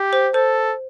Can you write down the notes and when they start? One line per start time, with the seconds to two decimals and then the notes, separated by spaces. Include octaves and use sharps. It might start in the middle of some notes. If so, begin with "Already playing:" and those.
Already playing: G4
0.13 C5
0.34 A4 C5